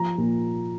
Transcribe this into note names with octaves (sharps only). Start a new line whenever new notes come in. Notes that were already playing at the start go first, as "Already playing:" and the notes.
Already playing: F3 A#5
A#2